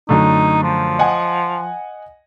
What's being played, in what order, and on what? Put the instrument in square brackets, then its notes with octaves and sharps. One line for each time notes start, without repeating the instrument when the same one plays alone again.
[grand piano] F#2 D3 A3 [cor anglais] D#4
[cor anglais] F3
[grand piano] D#5 F#5 G#5